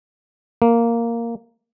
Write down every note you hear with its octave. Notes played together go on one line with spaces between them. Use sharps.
A#3